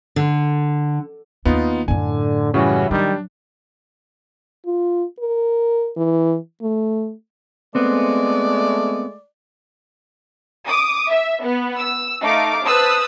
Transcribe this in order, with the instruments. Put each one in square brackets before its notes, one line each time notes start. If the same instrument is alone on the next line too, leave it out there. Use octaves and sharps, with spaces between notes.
[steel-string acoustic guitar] D3
[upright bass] D#2 C4 [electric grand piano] B3 D#4 F4
[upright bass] F#2 A2 [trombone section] D3 [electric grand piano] G#5
[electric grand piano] C#3 E3 G3 [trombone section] C#4 E4 F#4
[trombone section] D#3 G3 [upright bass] F#3 [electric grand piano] D4
[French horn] F4
A#4
E3
A3
[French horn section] G#3 A3 [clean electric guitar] B3 C4 [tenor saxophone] D5
[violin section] D6 D#6
E5
B3
E6
A3 D#4 F5 D6
B4 C5 A5 D#6 E6 F#6